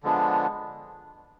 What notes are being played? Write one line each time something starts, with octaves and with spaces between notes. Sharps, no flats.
D3 F3 G#3 B3 D4